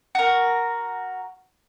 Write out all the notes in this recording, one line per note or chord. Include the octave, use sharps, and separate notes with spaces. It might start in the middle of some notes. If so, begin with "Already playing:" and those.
F#4 A#4